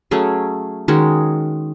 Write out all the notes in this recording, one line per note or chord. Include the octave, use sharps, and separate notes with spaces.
F#3 A3 C#4 G#4
D#3 G#3 C#4 F#4